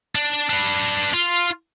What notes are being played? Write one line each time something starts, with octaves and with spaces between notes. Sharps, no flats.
D4
D4 B4
F4